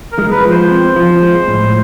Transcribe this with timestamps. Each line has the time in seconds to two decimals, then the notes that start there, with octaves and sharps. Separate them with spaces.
0.12 A#4
0.18 G#3
0.31 B4
0.45 F3
0.50 C5
0.70 C4
0.96 F3
1.22 G#3
1.48 A2